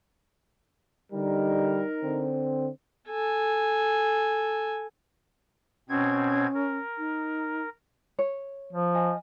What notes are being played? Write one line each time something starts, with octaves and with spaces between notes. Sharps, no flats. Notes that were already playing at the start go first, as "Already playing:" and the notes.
D3 G3 D#4 A#4
D3 C4
A4 G#5
B2 C4 C#4 G#6
A#4
D#4
C#5
F3
D#5 G#5